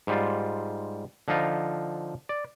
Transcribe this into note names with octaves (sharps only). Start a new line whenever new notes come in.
G#2 G3 F4
D3 F3 D#4 F4
D5